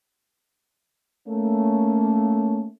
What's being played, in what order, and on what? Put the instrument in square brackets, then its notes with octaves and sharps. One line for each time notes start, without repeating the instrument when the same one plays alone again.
[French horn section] A3 A#3 C#4